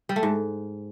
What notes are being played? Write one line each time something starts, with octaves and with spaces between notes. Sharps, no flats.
G3
A3
G#2